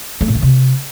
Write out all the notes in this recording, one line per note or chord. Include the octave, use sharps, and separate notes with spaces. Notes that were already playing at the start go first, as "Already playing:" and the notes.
A3
A#2
D#3
C3